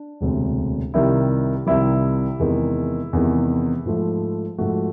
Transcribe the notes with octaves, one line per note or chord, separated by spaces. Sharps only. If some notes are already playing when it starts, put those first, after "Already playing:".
Already playing: D4
E1 D2 C3
C2 C3 D#3 G3 E4
C2 C3 D#3 G3 E4
E2 C3 D#3 G#3
E2 C3 D#3 G#3
G#2 F3 A3
G#2 F3 A3 F#4